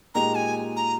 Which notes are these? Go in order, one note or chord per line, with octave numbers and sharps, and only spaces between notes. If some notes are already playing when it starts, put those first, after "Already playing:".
A#2 G#3 D#4 G4 A#5
G#5
A#5